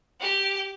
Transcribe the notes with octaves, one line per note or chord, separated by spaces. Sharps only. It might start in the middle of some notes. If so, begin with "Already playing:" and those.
G4